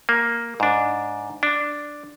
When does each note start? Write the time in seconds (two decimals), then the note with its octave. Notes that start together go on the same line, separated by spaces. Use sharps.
0.09 A#3
0.60 G#2 D4
1.43 D4